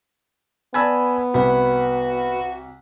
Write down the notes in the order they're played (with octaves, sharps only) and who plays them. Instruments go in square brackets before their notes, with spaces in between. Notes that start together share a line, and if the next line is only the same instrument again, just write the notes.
[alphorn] B3 [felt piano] D5 A5 G#6 [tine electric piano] G#5 B5 E6
[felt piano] C2 [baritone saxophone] F#4 [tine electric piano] B4 B5